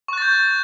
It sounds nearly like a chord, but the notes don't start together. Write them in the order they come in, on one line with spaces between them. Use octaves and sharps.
C#6 F#6 A6 G6